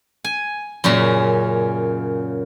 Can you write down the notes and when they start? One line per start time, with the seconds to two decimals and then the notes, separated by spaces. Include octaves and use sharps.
0.24 G#5
0.84 F#2 A#2 C#3 A#5